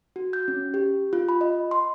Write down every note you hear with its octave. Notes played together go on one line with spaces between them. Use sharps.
F#4
G6
C#4
G4
F4
B5
D#5
C6